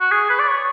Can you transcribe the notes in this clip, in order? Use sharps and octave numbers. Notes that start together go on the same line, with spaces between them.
F#4
G#4
B4
D5
C#5